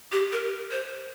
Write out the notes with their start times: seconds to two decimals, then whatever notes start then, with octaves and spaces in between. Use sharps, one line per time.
0.12 G4
0.32 A#4
0.71 C5